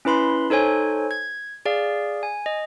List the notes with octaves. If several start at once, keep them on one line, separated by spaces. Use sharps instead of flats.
C#4 E4 B4 B5 C6
D#4 A4 C5 C#5 G#5
G#6
G#4 D5 F5
G#5
D#5